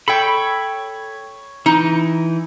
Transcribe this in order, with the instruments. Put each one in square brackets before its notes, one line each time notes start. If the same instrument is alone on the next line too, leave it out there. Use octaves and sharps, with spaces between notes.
[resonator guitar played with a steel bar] A4 G5 [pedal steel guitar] C#5 B5
[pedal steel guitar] E3 [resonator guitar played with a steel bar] D#4